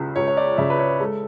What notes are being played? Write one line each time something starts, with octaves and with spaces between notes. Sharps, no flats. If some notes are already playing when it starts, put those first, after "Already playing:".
Already playing: C#2 C#3
C#2 C#5
C#5
D5
C#3 E5
B4
C#5
G#3 A4